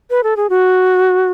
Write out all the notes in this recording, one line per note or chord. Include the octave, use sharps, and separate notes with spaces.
B4
A4
G#4
F#4